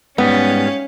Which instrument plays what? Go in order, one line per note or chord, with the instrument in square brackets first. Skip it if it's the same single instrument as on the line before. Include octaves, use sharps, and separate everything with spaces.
[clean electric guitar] G#2 G3 [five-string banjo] B3 [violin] C#4 F5